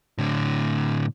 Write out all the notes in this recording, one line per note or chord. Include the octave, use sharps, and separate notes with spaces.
A2 D3